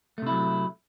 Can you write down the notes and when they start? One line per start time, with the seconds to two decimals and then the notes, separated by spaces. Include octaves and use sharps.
0.18 A3
0.22 C3
0.27 E4
0.31 F#3